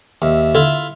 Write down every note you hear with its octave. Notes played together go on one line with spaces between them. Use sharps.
D#2 E5
D3 E4 F4